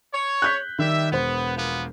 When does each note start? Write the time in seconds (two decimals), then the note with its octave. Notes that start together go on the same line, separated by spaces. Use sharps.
0.13 C#5
0.42 F#6 G6 B6
0.79 D#3 G3 E5
1.12 E1 B3 C5
1.57 F3 A#3 B3